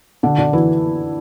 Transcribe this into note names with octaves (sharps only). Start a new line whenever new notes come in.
D3 D4
D3 D4
E3 E4